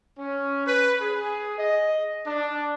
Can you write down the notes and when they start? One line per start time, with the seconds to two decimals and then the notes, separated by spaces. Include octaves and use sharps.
0.17 C#4
0.66 B4
1.00 G#4
1.57 D#5
2.26 D4